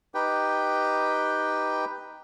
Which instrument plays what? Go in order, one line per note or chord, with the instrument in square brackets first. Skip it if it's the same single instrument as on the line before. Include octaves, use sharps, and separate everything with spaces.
[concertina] D#4 G4 B4 G5